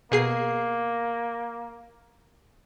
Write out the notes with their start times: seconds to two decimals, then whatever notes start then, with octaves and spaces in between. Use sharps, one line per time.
0.12 B2 A#3 G#4 C7